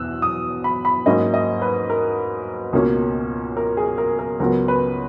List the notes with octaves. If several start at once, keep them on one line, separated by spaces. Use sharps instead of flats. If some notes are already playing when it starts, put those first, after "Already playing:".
Already playing: E2 B2 E6 F#6
D#6
B5
B5
G#2 F#3 A#3 C#4 D#5
D#5
B4
A#4
C#2 B2 A#3 C#4
A#4
G#4
A#4
A#4
C#2 C#3 F#3 B3 A#4
B4